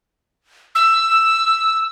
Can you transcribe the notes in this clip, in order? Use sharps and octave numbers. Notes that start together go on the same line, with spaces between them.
E6